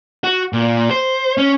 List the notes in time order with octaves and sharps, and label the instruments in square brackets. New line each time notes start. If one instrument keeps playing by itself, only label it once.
[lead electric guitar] F#4
A#2
C5
C#4